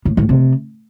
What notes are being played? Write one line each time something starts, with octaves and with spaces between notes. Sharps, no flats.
A2
A2
C3